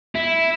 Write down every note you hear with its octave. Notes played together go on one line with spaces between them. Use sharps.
E4